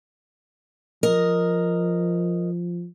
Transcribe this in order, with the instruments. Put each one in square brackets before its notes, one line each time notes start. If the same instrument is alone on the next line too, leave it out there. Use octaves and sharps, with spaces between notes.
[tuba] F3 [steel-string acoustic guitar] A#4 D#5